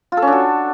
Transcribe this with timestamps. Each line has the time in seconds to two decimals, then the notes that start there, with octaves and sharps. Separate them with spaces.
0.12 F4
0.17 A4
0.22 C#4
0.27 D4
0.33 F#4